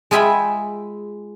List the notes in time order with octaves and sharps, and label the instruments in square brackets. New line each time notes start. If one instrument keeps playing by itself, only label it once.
[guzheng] G#3 F4 G#4 E5 G5 B5